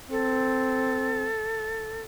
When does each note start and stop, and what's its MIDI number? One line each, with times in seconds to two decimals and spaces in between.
0.11 1.28 60
0.11 2.02 69